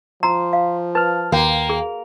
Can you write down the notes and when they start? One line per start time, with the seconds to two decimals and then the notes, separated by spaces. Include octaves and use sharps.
0.23 F3 A#5 C6
0.53 F5
0.95 B4 A5 F6
1.32 D#2 A#3 F#4 G5
1.70 G#4